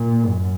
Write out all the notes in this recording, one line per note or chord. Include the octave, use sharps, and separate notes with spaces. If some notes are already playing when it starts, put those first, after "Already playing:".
Already playing: A#2
F#2